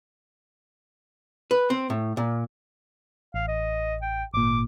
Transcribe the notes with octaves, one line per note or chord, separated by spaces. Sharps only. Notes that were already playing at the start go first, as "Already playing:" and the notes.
B4
C4
A2
A#2
A1 F5
D#5
G5
G#1 A#2 D6